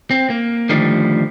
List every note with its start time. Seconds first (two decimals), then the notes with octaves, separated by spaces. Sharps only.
0.11 C4
0.30 A#3
0.69 D3 D#3 F3 G3 A3